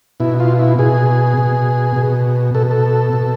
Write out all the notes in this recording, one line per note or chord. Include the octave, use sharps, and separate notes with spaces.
B2 E4
F4
E4
B2 G#4
B2
B2
B2 A4
A4
B2